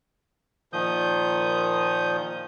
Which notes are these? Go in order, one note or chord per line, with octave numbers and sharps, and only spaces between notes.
A#2 D#3 F3 D#6 G6